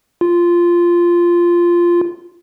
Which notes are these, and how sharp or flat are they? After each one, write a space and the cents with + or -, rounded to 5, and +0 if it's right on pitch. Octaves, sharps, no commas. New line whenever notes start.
F4 -10